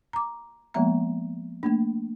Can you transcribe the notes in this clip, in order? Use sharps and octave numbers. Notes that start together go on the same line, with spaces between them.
A#5 D6
F3 G#3 A#3 B3 E5 A#5
A3 A#3 D4